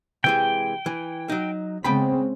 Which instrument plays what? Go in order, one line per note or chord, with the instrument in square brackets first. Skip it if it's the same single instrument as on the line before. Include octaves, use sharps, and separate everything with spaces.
[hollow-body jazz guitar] C3 E3 G#3 [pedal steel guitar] G5
[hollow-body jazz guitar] E3
F#3 D#4
[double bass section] C#3 G#3 C4 [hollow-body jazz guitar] B3 G5 B5